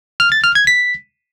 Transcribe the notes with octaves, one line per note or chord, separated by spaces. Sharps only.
F6
A6
F6
G#6
B6